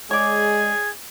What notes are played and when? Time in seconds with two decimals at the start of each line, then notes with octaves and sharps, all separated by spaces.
0.11 G#3 G#4 C#5 D5 G#6